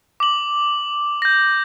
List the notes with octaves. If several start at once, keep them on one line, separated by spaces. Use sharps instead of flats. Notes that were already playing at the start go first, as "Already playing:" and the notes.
D6 F#7
G6 A#6